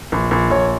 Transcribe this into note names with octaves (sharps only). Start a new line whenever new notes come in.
A#1
A#1
A#1 C#5